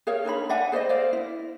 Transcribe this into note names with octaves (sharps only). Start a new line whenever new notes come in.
G#4 A#4 C#5 F5
D4 D#4 C#5 B5
D5 E5 F#5 G#5
G#4 C5 D5 D#5
C5 D5 F5
E4